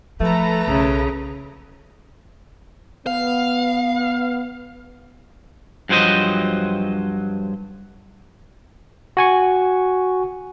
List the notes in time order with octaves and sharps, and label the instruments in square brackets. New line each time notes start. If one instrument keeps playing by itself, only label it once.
[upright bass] F3 [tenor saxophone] A3 [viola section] A4 B4 A#5
[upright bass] B1 [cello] C#3
[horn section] B3 [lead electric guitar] F5
[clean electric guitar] G2 F3 F#3 C5 D#5
[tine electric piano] F#4 G#5 C#6